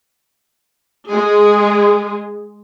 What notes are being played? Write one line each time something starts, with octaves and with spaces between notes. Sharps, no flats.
G#3 G#4